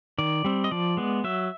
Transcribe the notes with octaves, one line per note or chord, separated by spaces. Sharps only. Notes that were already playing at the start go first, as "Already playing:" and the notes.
D#3 D5
G3 C4
D#5
F3 D5
G#3 B3
F#3 E5